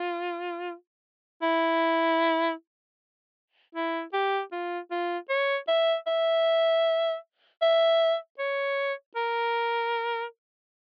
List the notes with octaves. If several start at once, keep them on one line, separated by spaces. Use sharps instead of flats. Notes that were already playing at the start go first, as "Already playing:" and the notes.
Already playing: F4
E4
E4
G4
F4
F4
C#5
E5
E5
E5
C#5
A#4